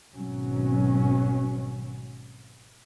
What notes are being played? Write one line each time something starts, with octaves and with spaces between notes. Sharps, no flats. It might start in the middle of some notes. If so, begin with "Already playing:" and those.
G#1 B2 F#3 C#4